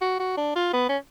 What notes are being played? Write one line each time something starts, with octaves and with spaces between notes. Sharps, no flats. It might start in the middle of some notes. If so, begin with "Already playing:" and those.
F#4
F#4
D4
F4
B3
C#4